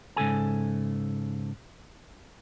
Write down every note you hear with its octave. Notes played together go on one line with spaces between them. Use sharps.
G#2 C#3 A4 G#5